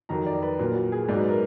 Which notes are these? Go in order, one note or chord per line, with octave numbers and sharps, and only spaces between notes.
F2 D#3 F#3 A#5
D5
B4
A#2 F#3 A#4
F#4
G#4
G#2 F#3 D5
B4
A#4